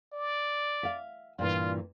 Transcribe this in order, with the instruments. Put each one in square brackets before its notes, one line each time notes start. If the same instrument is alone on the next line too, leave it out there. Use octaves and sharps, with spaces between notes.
[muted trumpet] D5
[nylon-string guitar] E5 F5
[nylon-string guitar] G2 A#2 E3 [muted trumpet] F4